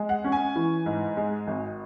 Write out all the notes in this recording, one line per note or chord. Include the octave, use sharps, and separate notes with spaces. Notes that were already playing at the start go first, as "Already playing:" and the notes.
Already playing: G#3
F#5
C#4
G#5
E3
G#2
G#3
G#1